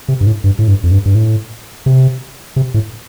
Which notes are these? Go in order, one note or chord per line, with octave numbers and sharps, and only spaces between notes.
C3
G2
A2
G2
A2
G2
F2
G2
G2
A2
C3
C3
A2